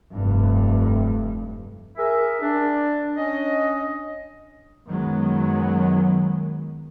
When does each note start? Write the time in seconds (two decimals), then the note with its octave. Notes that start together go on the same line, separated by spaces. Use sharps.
0.13 F1 G2
1.97 G#4 A#4 E5
2.41 D4
3.17 C#4 D4 D#5
4.88 F#2 D#3 F#3 G#3 B3